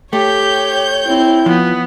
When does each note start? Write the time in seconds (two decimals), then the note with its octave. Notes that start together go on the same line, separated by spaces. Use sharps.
0.13 A3 G4 C#5 G6
1.07 C4 E4
1.46 F3 B3